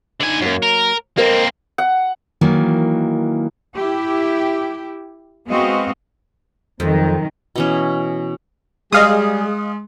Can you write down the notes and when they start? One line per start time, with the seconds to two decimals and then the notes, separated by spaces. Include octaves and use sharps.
0.20 D3 D#4 G#5
0.42 F#2 F#3 A#3
0.62 A#4
1.17 A#3 C4 A#4 C5 D#5
1.78 F#5
2.41 D#3 E3 F#3 A#3
3.73 E4 G4
5.48 G#3 B3 C4 F#4 D#5 F5
6.80 F2 C3 D#3 F#3
7.56 B2 E3 C#4
8.92 G3 G#3 G#4 D#5 F5 D#6